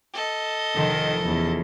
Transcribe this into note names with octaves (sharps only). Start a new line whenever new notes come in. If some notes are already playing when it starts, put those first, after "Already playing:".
A4 D#5
F1 D#3 F4 A5
E2 C#4